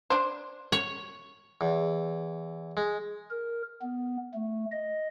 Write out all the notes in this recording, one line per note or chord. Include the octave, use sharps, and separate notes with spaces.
D4 C5
C#5
E2
G#3
A#4
B3
A3
D#5